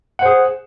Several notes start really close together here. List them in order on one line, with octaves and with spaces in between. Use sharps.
F#5 C5 G#4